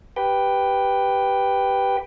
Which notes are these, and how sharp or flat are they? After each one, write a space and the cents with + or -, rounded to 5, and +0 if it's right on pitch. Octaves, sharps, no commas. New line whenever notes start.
G4 +0 B4 +0 G5 +0